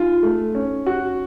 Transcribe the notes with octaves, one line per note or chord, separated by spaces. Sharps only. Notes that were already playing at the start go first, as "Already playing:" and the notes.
Already playing: D#4 F4
A3
C#4
F#4